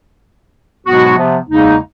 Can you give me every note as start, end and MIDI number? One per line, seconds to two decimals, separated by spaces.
0.86 1.16 44
0.86 1.16 47
0.86 1.16 54
0.86 1.16 56
0.86 1.16 59
0.86 1.16 66
1.17 1.37 48
1.17 1.37 53
1.17 1.37 59
1.49 1.76 40
1.49 1.76 49
1.49 1.76 56
1.49 1.76 58
1.49 1.76 63